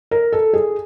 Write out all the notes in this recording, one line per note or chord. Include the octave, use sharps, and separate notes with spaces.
A#4
A4
G#4